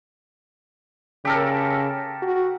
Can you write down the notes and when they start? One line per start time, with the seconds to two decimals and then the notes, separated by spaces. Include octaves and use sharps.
1.25 C#3 G4 A4 A#4
2.22 F#4